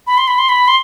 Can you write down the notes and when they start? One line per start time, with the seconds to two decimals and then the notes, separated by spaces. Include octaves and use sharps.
0.07 B5
0.18 C6
0.28 B5
0.38 C6
0.49 B5
0.68 C6